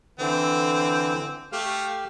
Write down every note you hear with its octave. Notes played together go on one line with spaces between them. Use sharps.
D3 E3 C4
A3 G4 F5